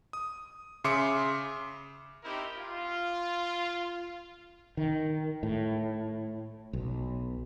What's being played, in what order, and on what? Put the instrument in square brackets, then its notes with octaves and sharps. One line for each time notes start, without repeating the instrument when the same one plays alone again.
[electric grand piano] D#6
C#3 E5 C6 D6 C#7
[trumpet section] C4 D#4 E4 G4 A#4
F4
[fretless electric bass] D#3
A2
B1